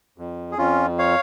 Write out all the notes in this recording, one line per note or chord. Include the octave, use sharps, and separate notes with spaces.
F2
G#4
F2 C#4 F4
C#5 F5